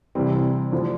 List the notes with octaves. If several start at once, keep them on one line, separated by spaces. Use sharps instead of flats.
C2 C3 E3 G3 C4
D2 D3 F3